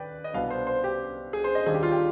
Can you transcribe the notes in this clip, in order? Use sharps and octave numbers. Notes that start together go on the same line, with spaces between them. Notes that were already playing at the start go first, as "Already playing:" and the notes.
Already playing: D#2 B4 D5 G5
D#5
C2 B2 B3 D4 F5
C5
C5
G4
G#4
C5
D#5
D#2 D#3 G3 D4 G#4
G4
F4
G4